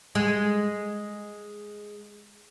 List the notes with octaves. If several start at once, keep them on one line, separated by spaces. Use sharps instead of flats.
G#3